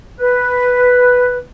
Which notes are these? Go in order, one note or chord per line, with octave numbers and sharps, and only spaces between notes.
B4